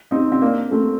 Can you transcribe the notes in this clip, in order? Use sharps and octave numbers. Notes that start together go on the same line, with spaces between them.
C4 D#4
C4
A#3 D4
A3 C4